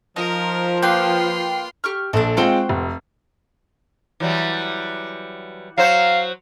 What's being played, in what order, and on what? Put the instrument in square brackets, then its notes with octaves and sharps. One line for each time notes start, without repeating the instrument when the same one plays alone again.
[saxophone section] F3 [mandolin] D#4 [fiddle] A#4
[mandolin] A#3 B4 [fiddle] F4 C6 [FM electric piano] G5
[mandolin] G4 C#6 F6
[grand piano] A#1 [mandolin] D4 A4
[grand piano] G#3 C4 F4 [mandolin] F#4 C5 G5
[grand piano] F1
[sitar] E3 F#3 G3
[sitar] F#3 C5 [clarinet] F5